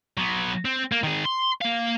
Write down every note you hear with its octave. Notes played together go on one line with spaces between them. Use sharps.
F#3 B3
C4
A#3
D#3 G#4
C6
A#3 F5